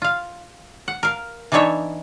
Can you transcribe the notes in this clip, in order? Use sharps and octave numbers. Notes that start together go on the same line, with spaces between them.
F4 F5
F#5
A#4 F5
E3 B3 D4 D#4 C#5 E5